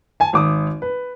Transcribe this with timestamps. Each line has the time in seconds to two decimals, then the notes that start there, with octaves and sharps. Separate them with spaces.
0.20 G#5 A5
0.33 G#1 D6 D#6
0.82 B4